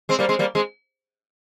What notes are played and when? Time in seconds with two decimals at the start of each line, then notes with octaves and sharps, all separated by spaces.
0.09 G#3 C4
0.19 G3 A#3
0.29 G#3 C4
0.39 G3 A#3
0.55 G#3 C4